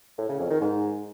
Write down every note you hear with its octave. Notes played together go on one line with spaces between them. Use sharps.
A2
C#3
F2
D#3
G#2